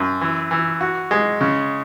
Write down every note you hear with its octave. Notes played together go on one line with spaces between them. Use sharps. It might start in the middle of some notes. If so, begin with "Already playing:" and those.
Already playing: F#2
E3
E3
F#4
G#3
C#3